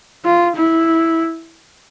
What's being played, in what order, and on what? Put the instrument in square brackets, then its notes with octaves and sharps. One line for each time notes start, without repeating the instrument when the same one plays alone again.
[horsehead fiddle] F4
E4